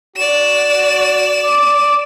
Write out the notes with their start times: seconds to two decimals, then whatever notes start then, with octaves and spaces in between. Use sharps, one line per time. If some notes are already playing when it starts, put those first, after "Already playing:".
0.17 F#4 D5 E7
1.44 D6